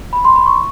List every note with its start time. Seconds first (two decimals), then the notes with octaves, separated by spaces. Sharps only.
0.13 B5
0.25 C6
0.36 B5
0.46 C#6